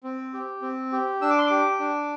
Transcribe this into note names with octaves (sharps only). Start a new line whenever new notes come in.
C4
G4
C4
G4
D4 E6
D6
C6
G4 D6
D4